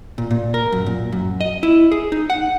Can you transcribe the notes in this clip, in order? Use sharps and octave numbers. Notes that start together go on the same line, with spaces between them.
A#2
A#2
A#4
F#2
A#2
F#2
D#5
E4
G#4
D#4
F#5